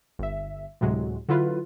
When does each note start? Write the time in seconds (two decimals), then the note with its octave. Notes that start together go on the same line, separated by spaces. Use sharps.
0.19 G1 E5
0.81 D2 A2 C3 F#3 G#3
1.29 D3 F#3 E4 F4 B4